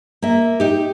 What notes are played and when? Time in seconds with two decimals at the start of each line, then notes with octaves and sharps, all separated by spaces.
0.22 A#3 E5
0.60 D#4 G4